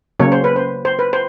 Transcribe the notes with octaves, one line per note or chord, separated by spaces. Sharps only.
C#3 F#3 A#3 C#4 C#5
C5
B4
C5
C5
B4
C5